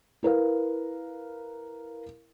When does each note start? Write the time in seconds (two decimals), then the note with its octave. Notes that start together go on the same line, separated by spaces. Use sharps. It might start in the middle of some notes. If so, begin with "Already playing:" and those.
0.23 E4 A#4 B4 F5